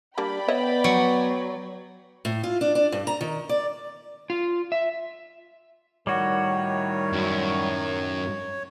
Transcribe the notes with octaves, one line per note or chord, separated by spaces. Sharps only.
G3 A#3 D4 D5 G5 B5
B3 C#5 D#5 E5
F#3
A2
F4
D4
D4
G2
A#5
D#3
D5
F4
E5
A2 D#3 G3 F#4 C#5
F#2